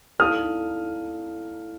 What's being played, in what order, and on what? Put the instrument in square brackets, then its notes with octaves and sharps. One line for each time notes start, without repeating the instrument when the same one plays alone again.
[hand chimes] E4 A4 D5 F5 A5 [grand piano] D#6 F6